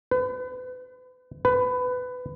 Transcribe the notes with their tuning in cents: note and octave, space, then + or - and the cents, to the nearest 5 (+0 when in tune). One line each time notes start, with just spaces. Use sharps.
B4 +35
B4 +20